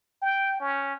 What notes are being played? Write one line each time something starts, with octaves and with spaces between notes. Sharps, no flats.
G5
C#4